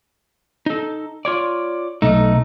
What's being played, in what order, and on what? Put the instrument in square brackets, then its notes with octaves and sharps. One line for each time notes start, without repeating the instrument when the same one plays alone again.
[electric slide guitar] D#4 A4
F4 C#5 D5
[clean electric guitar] B1 D#4 [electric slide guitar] A3